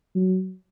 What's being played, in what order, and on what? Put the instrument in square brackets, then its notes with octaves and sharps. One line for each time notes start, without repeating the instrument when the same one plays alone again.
[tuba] F#3